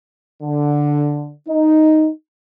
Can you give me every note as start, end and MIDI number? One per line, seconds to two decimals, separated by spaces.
0.43 1.33 50
1.49 2.09 63